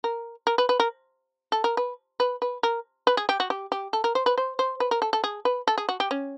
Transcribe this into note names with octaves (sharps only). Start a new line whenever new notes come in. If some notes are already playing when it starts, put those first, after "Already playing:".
A#4
A#4
B4
B4
A#4
A4
A#4
B4
B4
B4
A#4
B4
G#4
G4
F#4
G4
G4
A4
A#4
C5
B4
C5
C5
B4
A#4
A4
A4
G#4
B4
A4
G#4
F#4
G4
C#4